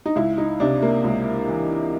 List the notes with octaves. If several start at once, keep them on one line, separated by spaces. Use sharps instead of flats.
D#4
C#2 E4
D#4
C3 D4
A#3
C#2
E3